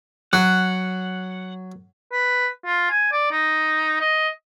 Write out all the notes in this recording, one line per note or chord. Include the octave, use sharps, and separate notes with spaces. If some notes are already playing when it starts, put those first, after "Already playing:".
F#3 F#5
B4
F4
G#5
D5
D#4
D#5